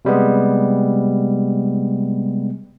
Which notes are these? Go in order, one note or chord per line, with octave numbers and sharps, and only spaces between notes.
C3 G3 G#3 B3